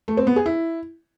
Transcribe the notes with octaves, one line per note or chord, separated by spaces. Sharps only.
A3
C4
B3
G#4
E4